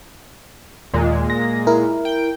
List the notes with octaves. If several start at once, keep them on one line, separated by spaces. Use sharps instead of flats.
D#2 A#2 G#3
A#6
E4 A#4
G5